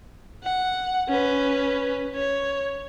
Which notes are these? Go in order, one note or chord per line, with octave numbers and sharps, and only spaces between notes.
F#5
C#4 B4
C#5